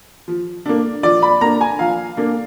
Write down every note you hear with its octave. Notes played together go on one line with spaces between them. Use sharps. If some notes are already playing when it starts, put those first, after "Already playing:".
F3
A#3 D4
F3 D5
B5
A#3 D4 A#5
G#5
F3 F5
A#3 D4